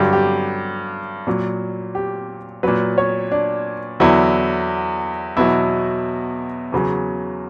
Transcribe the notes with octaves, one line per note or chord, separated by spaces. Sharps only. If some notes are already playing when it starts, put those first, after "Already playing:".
Already playing: G2 D3 F#3 G4
G4
A#2 F#3
G4
A#2 F#3 B4
C#5
D4
E2 D3 F#3 E4
E2 B2 F#3 E4
E2 C#3 F#3